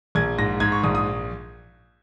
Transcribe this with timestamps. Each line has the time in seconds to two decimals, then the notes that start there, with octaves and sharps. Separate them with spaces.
0.15 A#1 G#6
0.38 G#2 A#6
0.60 G#2 G#6
0.72 C#6
0.83 A#1 D#6
0.95 D#6